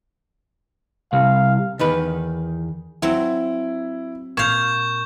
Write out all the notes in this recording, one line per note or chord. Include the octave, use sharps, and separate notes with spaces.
C2 F5
E2 D#3 B4
F#3 C4 E4
A#2 F5 C#6 G6 G#6